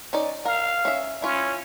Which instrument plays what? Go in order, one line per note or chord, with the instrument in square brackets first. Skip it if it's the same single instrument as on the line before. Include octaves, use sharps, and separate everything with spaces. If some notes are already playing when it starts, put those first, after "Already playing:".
[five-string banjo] C#4 D#4 D5
[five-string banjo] A#4 [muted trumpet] F5
[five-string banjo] C#4 E5
[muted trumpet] C#4 [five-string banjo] E4 F4